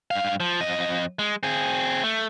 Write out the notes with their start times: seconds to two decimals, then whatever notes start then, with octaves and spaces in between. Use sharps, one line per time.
0.11 G2 F5
0.40 F3
0.61 F2 D#5
1.19 G#3
1.43 C4 G#4
2.03 A3